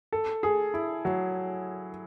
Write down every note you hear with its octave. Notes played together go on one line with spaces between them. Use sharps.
A4
G#4
E4
F#3